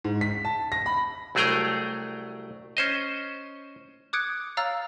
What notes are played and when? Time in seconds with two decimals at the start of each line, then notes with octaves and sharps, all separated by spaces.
0.04 G#2
0.21 B6
0.45 A5
0.72 A#6
0.86 B5
1.35 C2 F#3 A3 G#4 G5 A#5
2.77 C#4 C5 D#5
4.13 D6 D#6 F#6 G#6 C#7 D7
4.57 C#5 F5 A#5 E6 F6 A6